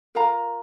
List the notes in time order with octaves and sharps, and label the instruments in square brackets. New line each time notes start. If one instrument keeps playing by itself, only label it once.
[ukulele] F4 A#4 F5 A#5